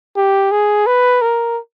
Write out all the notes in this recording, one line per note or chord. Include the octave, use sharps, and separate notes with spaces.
G4
G#4
B4
A#4